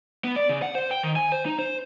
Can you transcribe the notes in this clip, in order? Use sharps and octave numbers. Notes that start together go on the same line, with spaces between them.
B3
D5
C#3
F#5
C5
G5
D#3
G#5
C5
D#4
C5